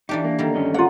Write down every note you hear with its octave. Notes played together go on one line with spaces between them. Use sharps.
E3 D4 D#4 G4
A#3
D3 D#3 G3
G2 C#4 D#5
A#3 F4 F#5